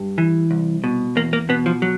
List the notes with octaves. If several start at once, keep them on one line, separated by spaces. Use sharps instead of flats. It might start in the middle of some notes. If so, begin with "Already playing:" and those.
Already playing: G2
E3
C2
B2
E2 A#3
A#3
B2 B3
F3
F#3